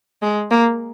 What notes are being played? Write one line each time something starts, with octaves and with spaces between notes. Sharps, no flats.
G#3
A#3